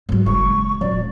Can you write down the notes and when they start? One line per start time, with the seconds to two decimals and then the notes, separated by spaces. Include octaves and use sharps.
0.09 G#2 F#3
0.26 F#1 G#3 C#6
0.81 D#1 F#3 D5